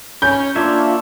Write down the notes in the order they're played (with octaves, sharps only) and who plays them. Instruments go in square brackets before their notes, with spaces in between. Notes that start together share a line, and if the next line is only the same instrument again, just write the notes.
[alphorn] C#4 [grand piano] G6
[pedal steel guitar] A#3 C#5 E5 [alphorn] D4 [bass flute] F4